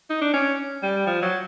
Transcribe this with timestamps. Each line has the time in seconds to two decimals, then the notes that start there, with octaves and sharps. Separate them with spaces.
0.10 D#4
0.22 D4
0.34 C#4
0.83 G3
1.07 F3
1.22 F#3